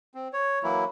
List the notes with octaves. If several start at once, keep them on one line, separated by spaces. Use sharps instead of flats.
C4
C#5
E3 F#3 A#3 E4